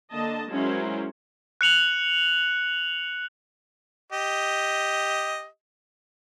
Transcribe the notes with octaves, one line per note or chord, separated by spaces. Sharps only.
D3 A#3 D#5 A5
F#3 G#3 C#4 E4 A#4 C5
F#6 C#7 F7 F#7
G4 D#5